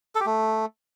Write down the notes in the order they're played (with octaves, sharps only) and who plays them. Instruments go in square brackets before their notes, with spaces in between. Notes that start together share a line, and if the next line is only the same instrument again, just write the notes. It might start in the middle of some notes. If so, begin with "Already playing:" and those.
[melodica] A4
G4
A3